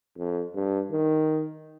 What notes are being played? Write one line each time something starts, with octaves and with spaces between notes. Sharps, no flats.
F2
G2
D#3